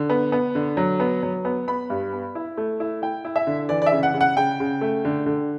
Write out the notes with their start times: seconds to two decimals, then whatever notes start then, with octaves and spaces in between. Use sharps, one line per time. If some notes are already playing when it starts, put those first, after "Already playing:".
Already playing: D3
0.10 B3
0.32 B3
0.55 D3
0.77 F#3
1.00 B3
1.23 F#3
1.45 B3
1.68 B3 B5
1.90 G2
2.13 B3
2.35 E4
2.57 A3
2.80 E4
3.02 E4 G5
3.25 E4
3.36 E5
3.47 D3
3.69 E3 D5
3.82 D5
3.86 E5
3.92 C#3
4.03 F#5
4.14 C#3
4.21 F#5
4.37 C#3 G5
4.60 C#3
4.81 A3
5.05 D3
5.26 D3